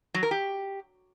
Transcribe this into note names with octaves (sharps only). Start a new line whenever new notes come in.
F#3
A#4
G4